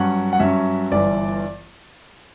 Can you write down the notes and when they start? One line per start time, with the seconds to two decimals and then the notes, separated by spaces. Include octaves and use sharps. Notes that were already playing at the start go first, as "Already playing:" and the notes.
Already playing: G2 F#3 C#4 F#5
0.33 F#5
0.39 G2 F#3 C#4 E5
0.92 G1 G2 E3 D5